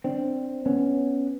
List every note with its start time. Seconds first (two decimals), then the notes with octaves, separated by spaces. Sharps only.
0.04 C4 D4
0.66 B3 C#4